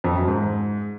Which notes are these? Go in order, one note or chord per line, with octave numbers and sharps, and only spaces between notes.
F2
F#2
G#2